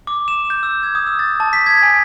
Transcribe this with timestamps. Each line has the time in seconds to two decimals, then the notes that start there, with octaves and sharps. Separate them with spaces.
0.07 D6
0.28 E7
0.50 G6
0.63 E6
0.83 G#6
0.95 D#6
1.07 E6
1.19 A6
1.40 A5
1.53 B6
1.66 G#6
1.82 G#5